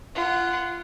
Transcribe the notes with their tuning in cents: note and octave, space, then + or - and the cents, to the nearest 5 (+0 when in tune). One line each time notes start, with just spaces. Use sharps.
F4 -25 F#5 +0